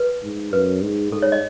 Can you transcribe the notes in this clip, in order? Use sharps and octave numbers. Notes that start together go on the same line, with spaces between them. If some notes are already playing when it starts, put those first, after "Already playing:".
Already playing: B4
G#2
F#2 B4
G#2
G#2 A4
C#5
D#5